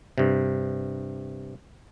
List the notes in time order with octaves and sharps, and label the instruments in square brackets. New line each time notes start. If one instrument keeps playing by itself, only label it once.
[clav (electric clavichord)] G2 C3